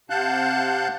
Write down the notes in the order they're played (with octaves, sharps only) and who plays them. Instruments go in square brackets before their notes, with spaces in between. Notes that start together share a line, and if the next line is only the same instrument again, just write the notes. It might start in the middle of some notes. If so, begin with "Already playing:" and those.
[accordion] C3 F5 F#5 A5 F#6 G6